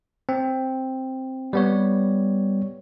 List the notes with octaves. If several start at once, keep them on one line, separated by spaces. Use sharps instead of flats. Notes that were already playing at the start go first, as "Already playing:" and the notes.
C4
G3 B3 C#5